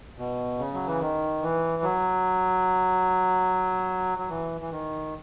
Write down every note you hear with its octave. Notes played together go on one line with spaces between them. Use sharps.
B2
C#3
F#3
E3
D#3
E3
F#3
F#3
E3
E3
D#3